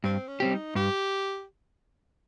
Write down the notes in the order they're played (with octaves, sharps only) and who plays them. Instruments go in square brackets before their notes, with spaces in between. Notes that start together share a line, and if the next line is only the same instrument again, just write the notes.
[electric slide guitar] G2 [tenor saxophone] C4
[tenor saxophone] C#4
[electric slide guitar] G3 C4 G4
[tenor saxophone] D#4
[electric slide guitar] G2 [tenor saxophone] G4